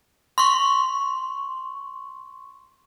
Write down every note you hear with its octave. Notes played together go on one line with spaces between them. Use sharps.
C6 C#6